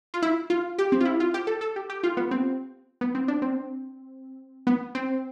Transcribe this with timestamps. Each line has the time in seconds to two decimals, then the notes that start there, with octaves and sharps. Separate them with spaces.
0.14 F4
0.22 E4
0.50 F4
0.78 G4
0.92 C4
1.01 F4
1.05 E4
1.20 F4
1.34 G4
1.47 A4
1.61 A4
1.76 G4
1.90 G4
2.03 F4
2.17 B3
2.31 C4
3.01 B3
3.15 C4
3.28 D4
3.42 C4
4.67 B3
4.95 C4